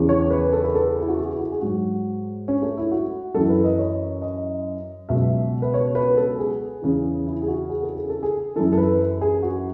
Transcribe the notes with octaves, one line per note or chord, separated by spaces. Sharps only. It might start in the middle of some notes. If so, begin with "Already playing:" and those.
Already playing: E2 C#3 E3
C#5
B4
A4
B4
A4
E4
F#4
G#4
E4
F#4
G#4
G#2 F#3 F#4
C#4
A3
E4
F#4
F#2 E3 A4
A4
B4
D#5
C#5
D#5
C#2 B2 F#3 E5
B4
C#5
B4
A4
G#4
E2 C#3 E3
E4
G#4
F#4
G#4
A4
G#4
A4
G#4
F#2 E3 A4
A4
B4
G#4
F#4